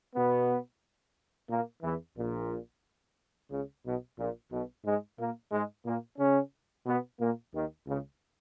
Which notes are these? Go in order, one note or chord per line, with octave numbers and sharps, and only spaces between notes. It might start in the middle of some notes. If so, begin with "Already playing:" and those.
B2 B3
A#2 A#3
E2 E3
A#1 A#2
C#2 C#3
B1 B2
A#1 A#2
B1 B2
G#2 G#3
A#2 A#3
G#2 G#3
A#2 A#3
C#3 C#4
B2 B3
A#2 A#3
D#2 D#3
C#2 C#3